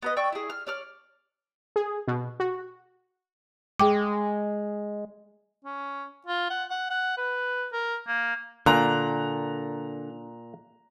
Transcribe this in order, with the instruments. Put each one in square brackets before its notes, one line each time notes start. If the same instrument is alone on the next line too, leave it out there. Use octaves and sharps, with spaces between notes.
[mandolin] B3 B4 D#5
D5 G5 C#6 E6
E4 G#4
F6
C#5 D5 F6
[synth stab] G#4
B2
F#4
[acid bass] G#3 [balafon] G#4 G5 D6
[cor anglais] C#4
F4
F#5
F#5
F#5
B4
A#4
A#3
[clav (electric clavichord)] A#2 [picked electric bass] D3 [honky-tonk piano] A#5 F#6